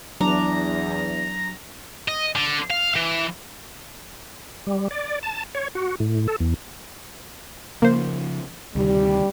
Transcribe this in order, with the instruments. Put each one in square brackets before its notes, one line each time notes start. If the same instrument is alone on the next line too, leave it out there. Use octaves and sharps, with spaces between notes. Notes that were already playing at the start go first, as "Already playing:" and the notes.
[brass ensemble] E2 [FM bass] F#3 [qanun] D4 [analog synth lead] A#5
[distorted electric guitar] D#5
D3
F5
E3
[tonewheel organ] G3
D5
A5
C#5
F#4
A2
A4
E2
[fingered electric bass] C#3 F3 [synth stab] A#3 C5
[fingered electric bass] D2 C3 D#3 [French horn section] G3